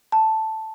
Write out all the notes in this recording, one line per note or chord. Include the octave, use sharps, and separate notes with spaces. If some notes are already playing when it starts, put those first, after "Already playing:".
A5